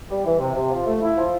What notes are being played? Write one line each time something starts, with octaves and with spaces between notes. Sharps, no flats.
G3
E3
C3
C3
F3
A3
E4
F3